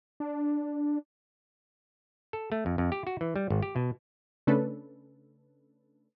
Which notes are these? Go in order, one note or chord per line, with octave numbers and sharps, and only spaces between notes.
D4
A4
A3
F2
F2
G4
F#4
E3
G3
G#1
G4
B2
C#3 A3 C#4 D4 A4 B4